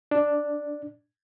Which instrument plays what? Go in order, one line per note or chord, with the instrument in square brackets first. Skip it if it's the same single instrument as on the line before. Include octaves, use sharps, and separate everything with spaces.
[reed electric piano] D4